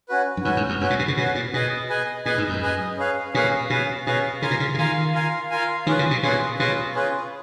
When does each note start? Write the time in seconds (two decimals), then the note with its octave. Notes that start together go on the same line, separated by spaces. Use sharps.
0.09 C#4 F#4 B4
0.37 F#2
0.44 G#2 C#4 F#4 B4
0.57 G#2
0.69 F2
0.81 F#2 C#4 F#4 B4
0.90 A#2
0.99 B2
1.08 C#3
1.17 B2 C#4 F#4 B4
1.35 A#2
1.53 B2 G#4 B4 D#5 G#5
1.89 G#4 B4 D#5 G#5
2.25 A#2 G#4 B4 D#5 G#5
2.38 G#2
2.49 F#2
2.62 G#4 B4 D#5 G#5
2.98 C#4 G#4 B4 F5
3.34 A#2 C#4 G#4 B4 F5
3.70 B2 C#4 G#4 B4 F5
4.06 B2 C#4 G#4 B4 F5
4.42 C#3 F4 A#4 F5 G#5
4.51 B2
4.60 C#3
4.74 C#3
4.78 D#3 F4 A#4 F5 G#5
5.14 F4 A#4 F5 G#5
5.51 F4 A#4 F5 G#5
5.87 D#3 C#4 F4 G#4 B4
5.99 C#3
6.11 B2
6.23 A#2 C#4 F4 G#4 B4
6.59 B2 C#4 F4 G#4 B4
6.95 C#4 F4 G#4 B4